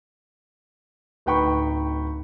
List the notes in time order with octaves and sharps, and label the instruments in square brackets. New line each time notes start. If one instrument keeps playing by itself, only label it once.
[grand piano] D1 D#4 B4 G5 B5 C#6